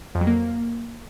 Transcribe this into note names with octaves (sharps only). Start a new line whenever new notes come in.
F2
F#3
A#3